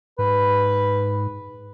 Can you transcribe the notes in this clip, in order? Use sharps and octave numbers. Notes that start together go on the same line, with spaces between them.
G#2 B4